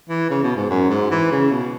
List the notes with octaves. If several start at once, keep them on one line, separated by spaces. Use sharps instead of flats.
E3
C#3
B2
G#2
F#2
G#2
E3
C#3
B2